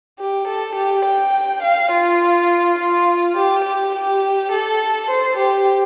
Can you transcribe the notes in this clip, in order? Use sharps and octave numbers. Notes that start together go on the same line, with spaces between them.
G4
A4
G4
G5
F5
F4
F4
G4
G4
G4
A4
C5
G4